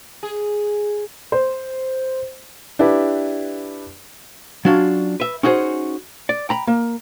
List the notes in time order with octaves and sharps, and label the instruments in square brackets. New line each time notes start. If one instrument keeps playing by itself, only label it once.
[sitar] G#4
[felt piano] C5
D4 E4 G4 B4
[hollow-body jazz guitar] F#3 C#4 D4 F4
B4 E5
C#4 D#4 F#4 G#4 C5
D5
G5 A#5 B5
A#3